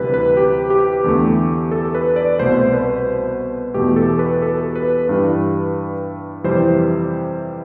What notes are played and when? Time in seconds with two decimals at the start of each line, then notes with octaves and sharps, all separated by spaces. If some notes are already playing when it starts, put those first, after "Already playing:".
Already playing: D2 C3 E3 G3 B4
0.14 B4
0.37 G4
0.70 G4
1.04 E2 D3 A3
1.71 A4
1.95 B4
2.16 D5
2.39 C2 B2 A3 C5
2.73 B4
3.74 E2 B2 A3 G4
3.96 A4
4.19 B4
4.42 A4
4.76 B4
5.09 G2 E3 G3
6.44 F2 C3 E3 G3 C5